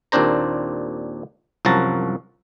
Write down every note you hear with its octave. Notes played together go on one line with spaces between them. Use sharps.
D#2 A#2 C4 D4 C5 A#5
C2 F#2 F3 F#4 A5 A#5